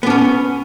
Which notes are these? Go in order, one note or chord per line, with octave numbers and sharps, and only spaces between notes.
B3 C#4 D4